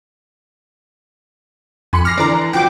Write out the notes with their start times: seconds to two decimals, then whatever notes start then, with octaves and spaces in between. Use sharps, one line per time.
1.93 F2 G#5 B5 C#7
2.05 D6 F6 A#6 C7
2.18 D3 E3 D5 A#5
2.53 C2 F3 F#4 G5 D6